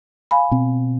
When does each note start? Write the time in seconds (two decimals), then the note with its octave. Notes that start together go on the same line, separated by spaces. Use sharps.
0.31 F5 G#5 B5
0.51 B2 C4